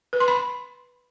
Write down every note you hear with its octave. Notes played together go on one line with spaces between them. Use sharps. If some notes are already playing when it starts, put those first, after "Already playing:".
B4
C6
B5